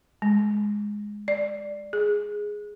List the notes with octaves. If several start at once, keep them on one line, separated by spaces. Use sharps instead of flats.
G#3
D5
G#4